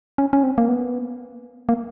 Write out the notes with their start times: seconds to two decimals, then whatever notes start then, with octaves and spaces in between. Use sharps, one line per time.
0.18 C#4
0.33 C#4
0.43 C4
0.58 A#3
0.68 B3
1.69 A#3